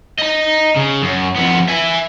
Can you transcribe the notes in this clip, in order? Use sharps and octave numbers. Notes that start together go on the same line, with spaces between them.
D#5 A#5
C#3
F#2
F2 B3
E5 G#5